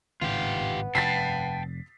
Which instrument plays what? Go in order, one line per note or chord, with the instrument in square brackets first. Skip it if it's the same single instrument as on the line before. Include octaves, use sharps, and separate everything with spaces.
[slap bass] G#1 A2 C#3 [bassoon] B3 [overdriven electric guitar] F4 G4
[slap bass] F1 [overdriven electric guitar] G5 A5 [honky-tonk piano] A6 B6 C7